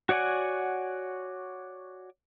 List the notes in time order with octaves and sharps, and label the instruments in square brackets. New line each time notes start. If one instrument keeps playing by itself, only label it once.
[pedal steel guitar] F#4 C#5 D5 F#5 G#5